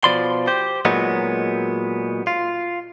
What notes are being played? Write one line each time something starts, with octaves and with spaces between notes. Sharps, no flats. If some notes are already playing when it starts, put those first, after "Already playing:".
B2 F3 D5 B5 C6
G4 C5
A#2 F#3 G#3 B3 D#4
F4